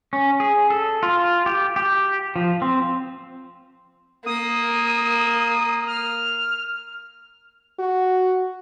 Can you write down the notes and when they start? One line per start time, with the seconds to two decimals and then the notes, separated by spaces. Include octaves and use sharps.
0.13 C#4
0.40 G#4
0.70 A4
1.03 F4
1.46 G4
1.76 G4
2.36 F3
2.62 C4
4.26 A#3 D#6
5.87 F6
7.79 F#4